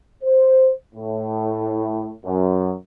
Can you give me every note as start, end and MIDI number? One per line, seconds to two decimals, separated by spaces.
0.24 0.71 72
0.95 2.12 45
2.25 2.74 42